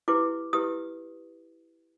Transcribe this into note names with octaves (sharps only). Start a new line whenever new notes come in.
E4 G4 B4 D6
E4 G4 B4 D#6